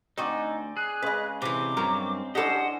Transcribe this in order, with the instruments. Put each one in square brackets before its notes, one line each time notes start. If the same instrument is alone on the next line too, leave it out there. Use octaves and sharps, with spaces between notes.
[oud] D2 F#4 D#5 [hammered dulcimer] C4 D5 G#5 [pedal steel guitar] D#4
[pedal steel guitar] G#4 [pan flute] F#6
[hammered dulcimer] C#3 G#3 [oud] B4 D#5
[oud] C3 E3 [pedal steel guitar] C4 [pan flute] D6
[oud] G2 F#3 A#4
[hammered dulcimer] E3 C#4 D4 [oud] G4 A4 [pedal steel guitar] C5 D#5 [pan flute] F#5